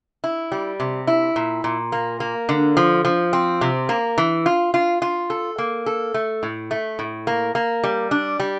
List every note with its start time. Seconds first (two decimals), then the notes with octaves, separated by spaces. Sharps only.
0.24 E4
0.52 G3
0.80 C3
1.07 E4
1.36 A#2
1.64 A#2
1.92 A#3
2.20 A#3
2.49 D3
2.77 F3
3.05 F3
3.33 C4
3.61 C3
3.89 A#3
4.18 E3
4.46 F4
4.74 F4
5.02 F4
5.30 A4
5.58 A#3
5.86 A4
6.14 A3
6.43 A2
6.71 A3
6.99 A2
7.27 A#3
7.55 A#3
7.83 G3
8.11 D4
8.40 G3